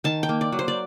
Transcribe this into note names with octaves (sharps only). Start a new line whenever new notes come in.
D#3 A5
G5
A#3
D5
F#3
C5
D5